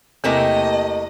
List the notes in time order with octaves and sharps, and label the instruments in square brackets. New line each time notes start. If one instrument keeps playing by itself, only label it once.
[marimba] E2 [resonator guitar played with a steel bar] C3 A3 A#3 [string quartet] D#5